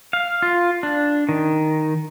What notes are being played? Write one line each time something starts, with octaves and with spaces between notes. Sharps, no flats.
F5
F4
D4
D#3